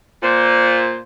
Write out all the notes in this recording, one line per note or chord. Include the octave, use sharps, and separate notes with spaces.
A#2 C5